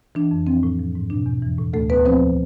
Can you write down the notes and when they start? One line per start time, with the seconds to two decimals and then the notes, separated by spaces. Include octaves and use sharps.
0.15 E3 D4
0.31 F2
0.47 F3 C4
0.63 A2
0.79 F3
0.95 G#2
1.10 B2 D4
1.26 E2
1.42 E3
1.59 A2
1.73 D2 A3 A4
1.90 D2 B3 B4
2.05 F3 C4 C5